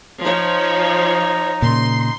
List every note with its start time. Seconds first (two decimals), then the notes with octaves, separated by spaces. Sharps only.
0.23 F3 D#4 C#5
1.62 A#2 C#3 C6